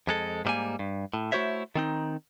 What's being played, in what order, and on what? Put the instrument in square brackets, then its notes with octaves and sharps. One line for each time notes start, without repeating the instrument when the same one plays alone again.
[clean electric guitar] F2 G#3 A4
G#2 B2 G3 A#3 G#5
G2
A2
A3 E4 F#4 C5 C#5 E5
D#3 C4 D#4